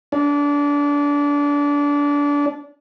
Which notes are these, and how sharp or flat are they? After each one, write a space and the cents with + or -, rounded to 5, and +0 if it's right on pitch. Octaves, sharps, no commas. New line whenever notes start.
D4 -25